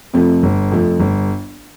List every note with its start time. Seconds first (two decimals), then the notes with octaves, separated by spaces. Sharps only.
0.13 F2 C3 F3 A3
0.43 G1
0.71 F2 C3 F3 A3
1.00 G1